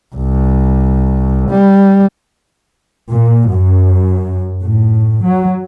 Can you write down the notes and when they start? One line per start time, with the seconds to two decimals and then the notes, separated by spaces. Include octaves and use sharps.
0.15 C2
1.50 G3
3.10 A#2
3.50 F#2
4.63 A2
5.24 F#3